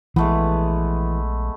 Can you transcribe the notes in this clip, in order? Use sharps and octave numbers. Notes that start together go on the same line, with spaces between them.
A#1 E3 G#3 A3 B3